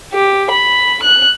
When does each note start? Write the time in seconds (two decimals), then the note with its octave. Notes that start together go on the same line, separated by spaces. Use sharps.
0.13 G4
0.50 B5
1.02 F#6